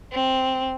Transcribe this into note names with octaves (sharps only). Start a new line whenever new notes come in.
C4